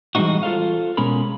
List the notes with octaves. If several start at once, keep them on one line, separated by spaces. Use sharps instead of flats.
E3 G3 G#3 C4 D#4 F#4
F4 A4 C5 F5
B2 G#3 C#4 G#4 A#4 B5